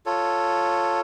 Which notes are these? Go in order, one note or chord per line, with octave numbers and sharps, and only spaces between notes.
F4 A4 C#5